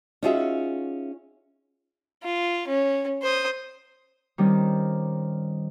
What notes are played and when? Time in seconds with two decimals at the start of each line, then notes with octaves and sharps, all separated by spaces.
0.23 C#4 D#4 F4 F#4 G#4 E5
2.23 F4
2.67 C#4
3.23 C5 D#6
4.38 D#3 G3 C4 C#4